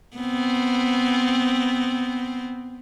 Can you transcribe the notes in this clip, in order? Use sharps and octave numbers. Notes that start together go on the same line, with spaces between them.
B3 C4